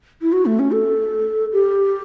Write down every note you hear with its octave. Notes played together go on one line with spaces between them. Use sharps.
E4
F#4
A3
C#4
A4
G4